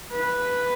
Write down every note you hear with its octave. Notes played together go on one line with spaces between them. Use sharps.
B4